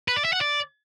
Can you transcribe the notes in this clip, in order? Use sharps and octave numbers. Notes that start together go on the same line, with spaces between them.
B4
D5
E5
F#5
D5